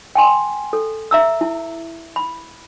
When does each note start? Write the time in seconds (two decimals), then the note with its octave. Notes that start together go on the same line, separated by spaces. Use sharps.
0.15 G5 G#5 C6
0.73 A4
1.11 E5 A#5 E6
1.41 E4
2.16 B5